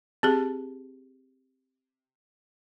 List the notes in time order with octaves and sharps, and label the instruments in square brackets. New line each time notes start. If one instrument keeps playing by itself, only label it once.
[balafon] C4 G4 G#4